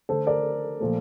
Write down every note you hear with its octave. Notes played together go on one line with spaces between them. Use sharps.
D3 A3 A4 C5
A#4 D5
A#2 F3 A3